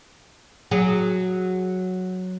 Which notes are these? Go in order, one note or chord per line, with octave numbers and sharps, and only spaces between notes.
F#3 G#4